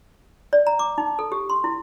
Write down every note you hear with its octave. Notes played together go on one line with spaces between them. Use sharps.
D5
A#5
D6
D#4
A4
G4
C6
E4